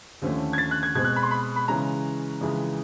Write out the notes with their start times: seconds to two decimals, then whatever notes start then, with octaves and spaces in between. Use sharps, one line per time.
0.22 D#2 D3 F3 A3 C#4
0.53 G#6
0.58 A6
0.71 F#6
0.83 G#6
0.95 B2 G#3 C4 G#6
1.04 F#6
1.16 B5
1.23 C6
1.31 B5
1.56 B5
1.68 C#3 E3 G#3 C#4 A#5
2.41 F2 C#3 E3 G#3